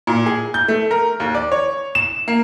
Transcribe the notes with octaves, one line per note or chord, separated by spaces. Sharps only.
A#2
G#4
G6
A3
A#4
D#2
D5
C#5
E7
A#3